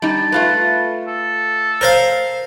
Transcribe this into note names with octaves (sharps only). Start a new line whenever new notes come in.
G3 D#4 A5
A3 F4 B4
A4
A#4 C5 F5